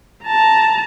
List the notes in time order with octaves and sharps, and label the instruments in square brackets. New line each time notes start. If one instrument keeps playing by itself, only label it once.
[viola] A5 A#5